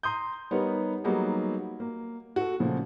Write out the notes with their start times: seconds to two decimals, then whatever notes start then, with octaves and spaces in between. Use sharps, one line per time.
0.03 A#5 C6 D#6 G6
0.51 G3 B3 D#4 A#4 B4 C#5
1.04 F#3 G3 A#3 B3 D#4 G#4
1.80 A#3
2.36 F#4 A4
2.60 A#2 C#3 F3 A3